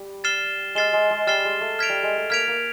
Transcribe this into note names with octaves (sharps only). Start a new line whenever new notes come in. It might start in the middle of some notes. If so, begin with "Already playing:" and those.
Already playing: G3
F6 A6 C7 E7 G7
G#3 F6 A6 C7 E7 G7
G#3
G#3
G3 F6 A6 C7 E7 G7
G#3
A3
F6 G#6 B6 D7 F7
G3
G#3
A3
A#3 F6 G#6 B6 D7 F7
A#3